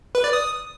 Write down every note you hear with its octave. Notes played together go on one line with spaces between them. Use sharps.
B4
D5
D#6